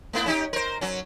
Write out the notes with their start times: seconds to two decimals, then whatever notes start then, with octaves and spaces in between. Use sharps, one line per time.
0.13 A3 B3 E4
0.26 C#4 D#4 G4
0.53 A#4 C5
0.81 F#3 C#4